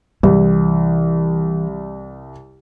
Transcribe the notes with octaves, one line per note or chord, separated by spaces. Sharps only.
C2 E3